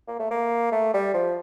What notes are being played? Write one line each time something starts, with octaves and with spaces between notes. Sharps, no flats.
A#3
A3
A#3
A3
G3
F3